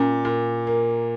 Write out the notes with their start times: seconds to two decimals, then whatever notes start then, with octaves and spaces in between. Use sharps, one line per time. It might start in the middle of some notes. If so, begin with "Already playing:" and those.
Already playing: A#2 C#4
0.25 A#2
0.67 A#3